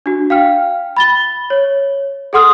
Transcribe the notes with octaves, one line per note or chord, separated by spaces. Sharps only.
D4 F#4
F5 G5 F6
B5 A6 G7
C#5
G#4 A4 F#5 C6 D#6 F6